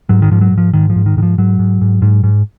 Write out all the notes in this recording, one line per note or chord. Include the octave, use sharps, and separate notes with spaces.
G#2 F#3
D#3
G#2 F3
F#3
G#2
F3
G#2 D#3
F3
G#2
D#3
G#2 D#3
F3
G#2 F#3
G#2
G#2
G#2
G#2